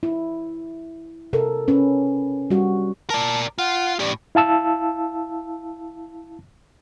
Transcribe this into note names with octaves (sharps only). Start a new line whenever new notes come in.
E4
C3 A4 A#4
C#4 B4
G3 F#4
A#4 D5 A5
F4 F#5
A2 G4 D5
E4 F5 A5 E6